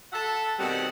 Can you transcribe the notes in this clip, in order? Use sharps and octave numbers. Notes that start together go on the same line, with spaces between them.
A4 E5 F#5 A5
B2 D#3 G3 C4 F#5